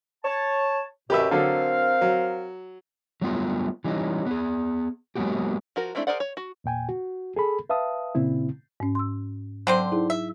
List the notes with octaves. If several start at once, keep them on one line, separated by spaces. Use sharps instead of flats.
C#5 A5
F#2 B2 G4 B4 E5
D3 F#3 C4 A4 A#4 F5
F#3
F#3 G3 A3 B3 E4 F4
E3 G3 C#4 D#4 F4
B3 G#4
F#3 G#3 A#3 B3 F#4 G4
F3 F#4 A#4
G#3 A3 C4 D4 E4
G#4 A#4 C5 D5 F#5
C#5
F#4
E2 A#2 G5 G#5
F#4
G#4 A4 B5
B4 E5 F5 A5 D#6
A#2 C#3 C4 E4
G#2 C#4
C6 E6
D3 F#3 C4 C5
D#4 E4 G#4
E5